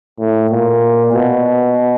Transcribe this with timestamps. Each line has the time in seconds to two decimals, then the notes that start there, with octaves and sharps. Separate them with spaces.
0.19 A2
0.51 A#2
1.13 B2